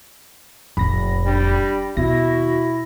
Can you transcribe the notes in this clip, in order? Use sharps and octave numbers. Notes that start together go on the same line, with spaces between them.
F1 A#2 B5 A#6
G3 D4
D#2 B2 E4 F#4 A#6